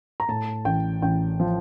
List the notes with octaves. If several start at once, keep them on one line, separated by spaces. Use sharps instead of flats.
A#5
A2 A5
A1 G5
A1 G5
F3